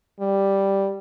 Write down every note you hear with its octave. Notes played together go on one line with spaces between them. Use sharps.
G3